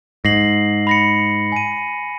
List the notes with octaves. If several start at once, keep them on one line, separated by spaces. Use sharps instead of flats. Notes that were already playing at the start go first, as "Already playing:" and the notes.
G#2 A#6 C7 F#7
B5 A#6 C#7
G#5 D#7